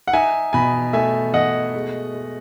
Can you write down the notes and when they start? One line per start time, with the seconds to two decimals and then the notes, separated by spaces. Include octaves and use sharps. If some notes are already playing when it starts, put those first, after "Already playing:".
0.07 F#5
0.13 D#4 E5 G#5
0.53 B2 G#5 B5
0.93 A3 E5 G#5
1.34 B2 D#5 F#5
1.75 G#3
2.15 G#3